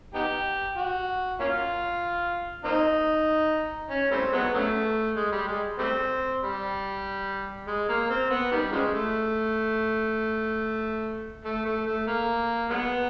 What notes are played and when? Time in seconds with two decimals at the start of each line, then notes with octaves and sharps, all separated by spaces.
0.14 B3 D#4 G4
0.77 F#4
1.40 A#3 C#4 F4
2.65 A#3 C4 D#4
3.90 C#4
4.11 G3 A3 C4
4.32 F#3 G#3 B3
4.54 C#3 F#3 A3
5.16 G#3
5.32 G3
5.48 G#3
5.79 G3 A3 C4
6.42 G3
7.67 G#3
7.89 A#3
8.10 C4
8.30 B3
8.51 D#3 G3
8.72 C#3 F3 G#3
8.93 A3
11.45 A3
11.65 A3
11.86 A3
12.07 A#3
12.70 F#3 G#3 B3